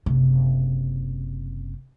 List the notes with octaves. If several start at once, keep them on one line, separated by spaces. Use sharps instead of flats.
F#1 C3